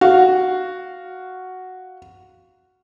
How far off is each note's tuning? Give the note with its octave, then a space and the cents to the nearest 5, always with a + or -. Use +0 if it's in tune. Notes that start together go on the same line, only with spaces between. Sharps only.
F#4 +0 F5 +0